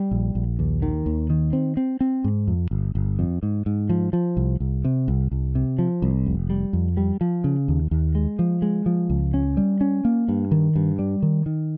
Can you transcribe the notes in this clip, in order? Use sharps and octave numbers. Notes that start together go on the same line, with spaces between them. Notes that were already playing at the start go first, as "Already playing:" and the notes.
Already playing: G3
A#1
A#1
D#2
D#3
D#2
D#3
C4
C4
C4
G#2
F2
G1
G1
F2
G#2
G#2
F3
F3
C2
C2
C3
C2
C2
C3
F3
C2
F1
G3
F2
G3
F3
C#3
D#2
D#2
G#3
F3
G#3
F3
C#2
C#4
G3
C#4
A#3
G2
D#3
G2
G3
D#3
D#3